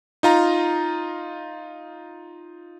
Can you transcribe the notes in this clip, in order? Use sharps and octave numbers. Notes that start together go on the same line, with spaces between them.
D#4 F4 A#5